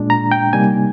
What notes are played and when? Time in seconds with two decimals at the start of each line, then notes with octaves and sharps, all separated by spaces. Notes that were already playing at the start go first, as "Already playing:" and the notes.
Already playing: A#2 G#3 D4
0.10 A#5
0.32 G5
0.53 C3 G3 A#3 D#4 G#5